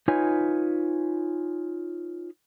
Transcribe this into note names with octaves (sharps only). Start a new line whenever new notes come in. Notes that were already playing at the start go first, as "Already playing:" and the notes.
D#4 F4 B4 C#5 G#5